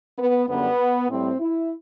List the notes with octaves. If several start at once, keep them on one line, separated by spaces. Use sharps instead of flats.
B3
F#2 D3 G3 B3
A2 G3 C4
E4